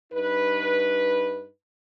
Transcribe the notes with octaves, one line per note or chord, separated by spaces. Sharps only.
G2 D#4 B4